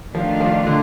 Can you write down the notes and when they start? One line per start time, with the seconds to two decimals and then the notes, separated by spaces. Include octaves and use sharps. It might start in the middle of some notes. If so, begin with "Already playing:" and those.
0.15 D#3 F3 A3 D4 F4
0.40 F3
0.66 D3